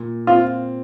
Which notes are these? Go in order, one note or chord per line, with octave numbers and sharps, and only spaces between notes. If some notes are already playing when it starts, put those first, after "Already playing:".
Already playing: A#2
C4 F4